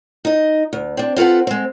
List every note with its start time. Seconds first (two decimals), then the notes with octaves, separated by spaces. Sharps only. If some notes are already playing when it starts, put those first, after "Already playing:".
0.25 D#4 D#5
0.73 D2
0.97 C4 D4
1.16 C4 F4 A4 B4 F#5
1.47 G#3 C4